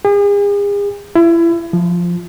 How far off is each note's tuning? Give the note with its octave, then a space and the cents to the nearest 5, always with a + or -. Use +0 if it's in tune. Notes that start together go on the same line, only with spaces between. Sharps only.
G#4 -45
E4 +30
F3 +0